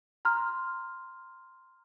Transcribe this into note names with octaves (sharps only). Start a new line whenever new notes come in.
A#5 C6 F6